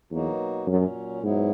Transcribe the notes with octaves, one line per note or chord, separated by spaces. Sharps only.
E2 B2 F#3 A#3 D#4 F#4
F#2 A#2 F#3 C#4
G#2 B2 F#3 B3 E4